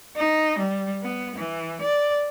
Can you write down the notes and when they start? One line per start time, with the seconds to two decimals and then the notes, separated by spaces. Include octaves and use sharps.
0.16 D#4
0.59 G3
1.02 B3
1.36 E3
1.81 D5